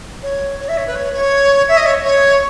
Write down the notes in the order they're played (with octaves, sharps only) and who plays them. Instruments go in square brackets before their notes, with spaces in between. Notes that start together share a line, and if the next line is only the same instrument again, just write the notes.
[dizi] C#5
C#5
E5
C#5
B4
C#5
C#5
E5
D#5
C#5
C#5